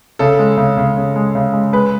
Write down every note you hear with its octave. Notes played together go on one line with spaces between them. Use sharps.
C#3 A4
G#3
C#3
C#3
C#3
G#3
C#3
G#3
G#3 B4